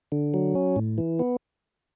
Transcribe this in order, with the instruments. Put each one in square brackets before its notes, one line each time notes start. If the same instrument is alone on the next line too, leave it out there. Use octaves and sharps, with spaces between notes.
[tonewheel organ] D3
F#3
C#4
A2
E3
B3